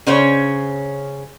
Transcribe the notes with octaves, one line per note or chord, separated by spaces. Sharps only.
C#3 C#4 C5 C#5